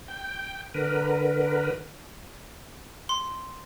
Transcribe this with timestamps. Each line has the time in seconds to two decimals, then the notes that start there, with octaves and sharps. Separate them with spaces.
0.08 G5
0.74 D3 A#4 B4
3.09 C6